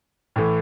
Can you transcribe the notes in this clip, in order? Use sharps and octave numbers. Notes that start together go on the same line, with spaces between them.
A2 E3 A3